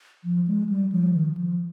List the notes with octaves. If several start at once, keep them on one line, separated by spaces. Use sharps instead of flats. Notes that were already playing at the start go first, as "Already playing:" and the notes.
F3
G#3
G3
F3
D#3
F3